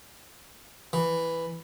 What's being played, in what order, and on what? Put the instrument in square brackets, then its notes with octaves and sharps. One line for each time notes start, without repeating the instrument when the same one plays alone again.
[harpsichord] E3